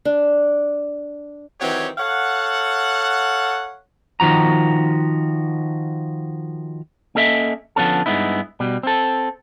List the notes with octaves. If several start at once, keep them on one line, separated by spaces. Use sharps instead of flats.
D4
D#3 E3 F#3 C4 G4 C#5
A4 C#5 F5 F#5
D#3 F3 F#4 A#5
A#3 C#4 A4 D#5 E5
D3 F3 B3 C#4 A4
G2 G#3 B3 D#4 E4
B2 G3
C4 A4